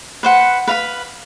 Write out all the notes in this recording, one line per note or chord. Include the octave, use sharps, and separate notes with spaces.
B4 C5 F#5
B4 F5 B5